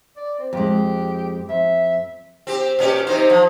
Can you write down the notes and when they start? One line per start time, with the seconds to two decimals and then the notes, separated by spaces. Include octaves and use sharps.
0.16 D5
0.39 C4
0.53 F2 G#3 G4
1.49 F2 E5
2.47 C4 G4
2.79 A#2 C#4 G4
3.07 C3 D#4 C5
3.30 F3